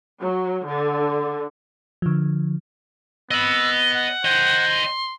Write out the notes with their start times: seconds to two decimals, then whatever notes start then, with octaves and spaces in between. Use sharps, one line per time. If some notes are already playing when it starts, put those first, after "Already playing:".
0.21 F#3
0.66 D3
2.02 D3 F3
3.31 B3 D#5 B5 E6
3.94 F#5
4.25 C5 D#5 G5
4.69 C6